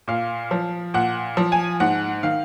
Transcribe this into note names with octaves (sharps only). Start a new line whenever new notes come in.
A#2 F5
F3
A#2 F#5
F3
G#5
G#2 F#5
D#3 F5